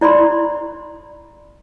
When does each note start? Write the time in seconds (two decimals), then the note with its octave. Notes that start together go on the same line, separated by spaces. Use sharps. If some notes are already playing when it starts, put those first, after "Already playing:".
0.01 E4 D5 B5 C6